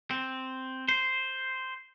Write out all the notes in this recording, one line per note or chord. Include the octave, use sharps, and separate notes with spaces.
C4
C5